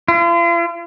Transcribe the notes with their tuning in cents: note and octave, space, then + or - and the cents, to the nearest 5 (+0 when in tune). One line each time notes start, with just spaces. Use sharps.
F4 -40